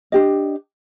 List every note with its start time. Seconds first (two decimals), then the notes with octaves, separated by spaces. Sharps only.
0.12 D4 G4 D#5